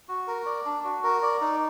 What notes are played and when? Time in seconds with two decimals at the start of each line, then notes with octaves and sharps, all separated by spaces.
0.09 F#4
0.27 A#4
0.46 D5
0.65 D4
0.84 F#4
1.03 A#4
1.22 D5
1.41 D#4